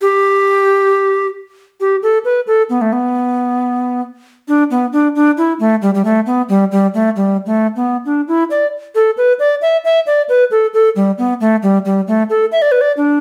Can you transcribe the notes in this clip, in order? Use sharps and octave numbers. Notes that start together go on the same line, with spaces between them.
G4
G4
A4
B4
A4
B3
A3
B3
D4
B3
D4
D4
E4
A3
G3
G3
A3
B3
G3
G3
A3
G3
A3
B3
D4
E4
D5
A4
B4
D5
E5
E5
D5
B4
A4
A4
G3
B3
A3
G3
G3
A3
A4
E5
D5
B4
D5
D4